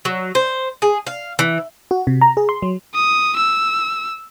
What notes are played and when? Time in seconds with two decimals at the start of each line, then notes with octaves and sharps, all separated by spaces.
0.05 F#3
0.35 C5
0.82 G#4
1.07 F5
1.39 E3
1.91 F#4
2.07 C3
2.21 A#5
2.37 G#4
2.49 C6
2.62 F#3
2.94 D#6
3.36 E6